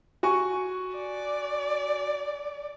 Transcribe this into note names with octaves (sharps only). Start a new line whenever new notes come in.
F#4 G#5 C#6
D5